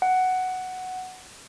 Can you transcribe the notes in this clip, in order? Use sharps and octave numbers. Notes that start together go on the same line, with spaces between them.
F#5